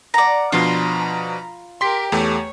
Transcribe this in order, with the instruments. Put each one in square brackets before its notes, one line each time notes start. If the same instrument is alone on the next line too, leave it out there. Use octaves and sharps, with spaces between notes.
[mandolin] D5 A#5 [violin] F#5
[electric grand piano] B2 F3 D4 [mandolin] F4 [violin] A#5 B5
[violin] G4 A#4 [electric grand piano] C6 B6
[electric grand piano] E2 A3 G4 [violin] C#5